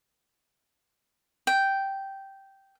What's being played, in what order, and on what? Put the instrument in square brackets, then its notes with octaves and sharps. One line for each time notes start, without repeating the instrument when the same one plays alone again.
[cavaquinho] G5